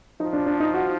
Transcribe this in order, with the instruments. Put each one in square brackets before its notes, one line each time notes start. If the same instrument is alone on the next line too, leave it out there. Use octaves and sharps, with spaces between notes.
[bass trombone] F3 [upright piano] D#4
[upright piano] D4
D4
D#4
F#4